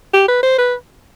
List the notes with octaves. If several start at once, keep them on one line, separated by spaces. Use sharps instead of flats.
G4
B4
C5
B4